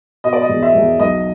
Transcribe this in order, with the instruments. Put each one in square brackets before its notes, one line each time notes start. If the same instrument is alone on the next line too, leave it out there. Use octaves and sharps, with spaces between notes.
[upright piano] B2 D#5
D5
D#5
E2
E5
E2
B1 D#5